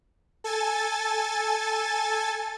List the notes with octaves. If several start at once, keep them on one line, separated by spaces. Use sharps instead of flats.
A4 G#5 A6